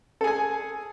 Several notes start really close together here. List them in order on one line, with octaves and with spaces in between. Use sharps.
A4 G#4 G#5